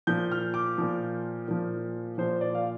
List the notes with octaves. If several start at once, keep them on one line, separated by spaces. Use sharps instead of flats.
A#2 F3 G6
F6
D6
A#2 F3
A#2 F3
A#2 F3 C5
D5
F5